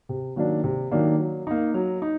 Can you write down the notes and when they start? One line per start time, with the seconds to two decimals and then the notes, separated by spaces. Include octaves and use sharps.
0.09 C3
0.36 D#3 F#3 A#3 D4
0.64 C3
0.91 D#3 F#3 A#3 D4
1.19 F#3
1.47 A#3 D#4
1.74 F#3
2.02 D#4